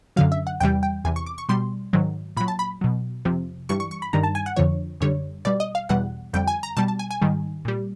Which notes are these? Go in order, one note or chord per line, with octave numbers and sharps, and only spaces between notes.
F#2 D3 F#3 F5
E5
F#5
E2 C3 E3 G3 G5
G5
E2 C3 E3 G#5
C#6
D6
C#6
B2 G3 C6
G#2 D#3 F#3
A#2 F#3 B5
A5
B5
B2 F#3
F2 C3 F3
G2 E3 G3 C#6
C#6
C#6
B5
G2 D#3 G3 A#5
A5
G#5
F#5
F2 D3 F3 C#5
F#2 D3 G3 C#5
B2 G3 D5
D#5
F5
E2 B2 G3 F#5
F2 D3 G3 G5
G#5
A#5
B2 G3 A5
A5
G#5
G#5
G#2 D#3 G3
A#2 G3